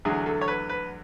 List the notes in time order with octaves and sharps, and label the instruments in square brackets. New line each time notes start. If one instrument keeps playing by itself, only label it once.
[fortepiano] E2 D3 F#3 A3 G#4
A4
C#5
B4
B4